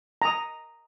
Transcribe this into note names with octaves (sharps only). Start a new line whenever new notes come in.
A#5 D#6